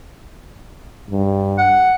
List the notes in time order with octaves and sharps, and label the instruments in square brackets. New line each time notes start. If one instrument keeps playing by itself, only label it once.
[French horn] G2
[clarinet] F#5